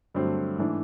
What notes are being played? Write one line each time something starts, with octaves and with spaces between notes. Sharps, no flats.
G2 D3 F#3 A3 C4
G#2 E3 A3 D4